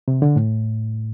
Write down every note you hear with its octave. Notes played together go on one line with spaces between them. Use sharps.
C3
D3
A2